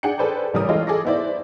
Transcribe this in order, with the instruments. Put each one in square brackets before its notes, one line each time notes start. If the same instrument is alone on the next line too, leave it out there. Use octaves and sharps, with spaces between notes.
[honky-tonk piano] D4 G#4 F#5 G5 C#7
G#4 A4 B4 C5 D5 G5
A1 C#3 G3 A#4 D#6
E3 G#3 F4 A4 C#5 D#5
G#4 A4 D6 A#6
B3 D#4 E4 C5 D5